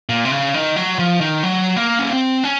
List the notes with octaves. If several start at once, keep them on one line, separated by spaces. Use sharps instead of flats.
A#2
C3
C#3
D#3
F#3
F3
D#3
F#3
A#3
C#4
C4
C#4